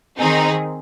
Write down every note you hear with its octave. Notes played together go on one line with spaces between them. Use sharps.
D#3 C4 D#4 G#4